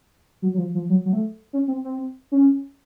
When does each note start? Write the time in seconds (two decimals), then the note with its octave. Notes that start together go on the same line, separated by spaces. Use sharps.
0.42 F#3
0.54 F#3
0.58 F3
0.75 F3
0.90 F#3
1.05 F#3
1.13 A3
1.53 C#4
1.68 C4
1.84 C4
2.32 C#4